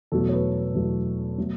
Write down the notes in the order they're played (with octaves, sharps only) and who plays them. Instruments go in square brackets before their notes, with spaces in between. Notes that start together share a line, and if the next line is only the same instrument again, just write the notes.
[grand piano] E2 B2 F#3 A3 A4
C#5
B4
E2 B2 F#3 A3
B2 F#3 A3